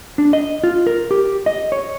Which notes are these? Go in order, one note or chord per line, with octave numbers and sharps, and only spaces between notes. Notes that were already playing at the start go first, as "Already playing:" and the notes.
D4
D#5
F4
A#4
G4
D#5
C#5